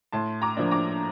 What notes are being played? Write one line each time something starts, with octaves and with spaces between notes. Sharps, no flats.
A2 A5 C6
A#5 D6
F3 A#3 D4
A#5 D6